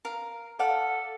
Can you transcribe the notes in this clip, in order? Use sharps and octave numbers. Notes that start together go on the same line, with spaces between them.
A#4 F5
A4 D5 F5 F#5